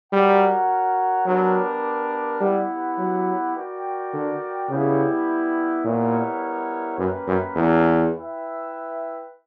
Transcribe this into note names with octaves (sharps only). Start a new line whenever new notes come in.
G3 F#4 A#4 C#5 F#5
F#3 B3 D4 G4 A#4
G3 B3 E4 G4 B4 F#5
F#3
F#4 A#4 D5 G5
D3
C#3 G3 B3 E4 G4
A#2 G3 B3 E4 A#4 C#5
F#2 A#3 C#4 G4 B4
F#2
E2
E4 B4 E5 G5